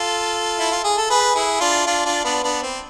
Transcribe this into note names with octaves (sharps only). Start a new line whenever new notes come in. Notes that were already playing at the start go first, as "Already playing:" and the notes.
Already playing: F4 A4
E4
F4
G#4
A4
G#4 B4
E4 G#4
D4 F4
D4 F4
D4 F4
B3 D4
B3 D4
C4